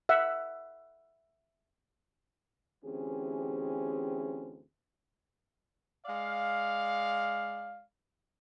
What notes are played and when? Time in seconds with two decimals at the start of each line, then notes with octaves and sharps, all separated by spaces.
0.09 E5 F#5
2.84 D2 E3 C4 C#4 G4 G#4
6.05 G#3 D5 F5